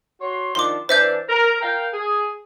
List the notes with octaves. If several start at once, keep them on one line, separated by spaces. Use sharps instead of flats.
F#4 C#5 C6
D#3 F3 D4 C6 D6
E3 D4 C5 E5 G6
A#4
A#4 F5 G5
G#4